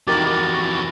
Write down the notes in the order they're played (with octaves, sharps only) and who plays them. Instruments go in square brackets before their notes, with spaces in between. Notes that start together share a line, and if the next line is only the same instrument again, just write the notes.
[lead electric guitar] F2 E3 [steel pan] D#4 G4 A#4 [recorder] F#4 [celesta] D6 A6